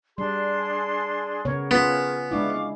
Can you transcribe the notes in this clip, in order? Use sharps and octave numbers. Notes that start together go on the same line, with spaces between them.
G3 D4 G#4 C6
C#3 B3 G#4 A#4 C#5
B3 C#4 F4
G#3 D4 E4 F5 C#6 D6